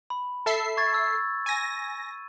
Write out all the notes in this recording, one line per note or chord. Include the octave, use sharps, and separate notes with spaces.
B5
A4 E5 C7
C#6 G#6 A6
E6
G#5 A#6 D#7